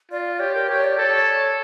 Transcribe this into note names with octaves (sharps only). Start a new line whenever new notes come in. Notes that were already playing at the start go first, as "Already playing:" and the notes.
F4 D5
G4 C#5
A#4
G4 C#5
D5
A4 C#5